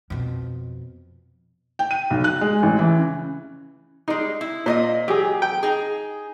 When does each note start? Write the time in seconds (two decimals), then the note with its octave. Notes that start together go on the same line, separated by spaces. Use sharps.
0.10 F2 B2
1.79 G5
1.91 D#7
2.10 B1
2.24 F#6
2.41 G#3
2.63 A1
2.79 E3
2.99 C#3
4.08 G3 G#3 D#4
4.41 E4
4.66 A#2 C5 D5 D#5
5.08 F#3 G4 G#4
5.42 G5
5.63 D#4 G#4